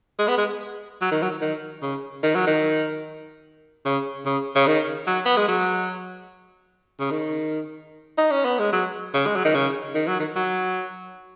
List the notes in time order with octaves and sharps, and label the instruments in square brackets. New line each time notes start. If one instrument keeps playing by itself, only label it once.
[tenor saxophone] G#3
B3
G#3
F#3
D#3
F#3
D#3
C#3
D#3
F#3
D#3
C#3
C#3
C#3
D#3
F#3
B3
G#3
F#3
C#3
D#3
D#4
C#4
B3
G#3
F#3
C#3
G#3
F#3
D#3
C#3
D#3
F#3
D#3
F#3